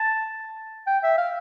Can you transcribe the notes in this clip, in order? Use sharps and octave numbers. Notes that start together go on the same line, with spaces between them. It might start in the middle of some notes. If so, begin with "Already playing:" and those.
Already playing: A5
G5
E5
F5